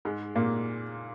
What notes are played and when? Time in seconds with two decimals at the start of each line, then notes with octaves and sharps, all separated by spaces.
0.05 G#2 G#3
0.35 A#2 A#3